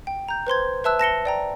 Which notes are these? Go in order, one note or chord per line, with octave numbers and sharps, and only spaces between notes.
G5
A#5 G6
B4 C5 C6 G#6
B4 E5 A5 E6 F#6
A5 A#6 C#7 G7
D5 G5 A#5